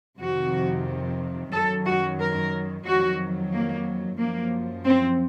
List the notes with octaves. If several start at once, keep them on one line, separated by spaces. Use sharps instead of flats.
F2 C3 D#3 F#4
F#2 D#3 F#3 A4
F#4
A#4
F2 D#3 F#3 F#4
A#3
F#2 F3 A#3
C4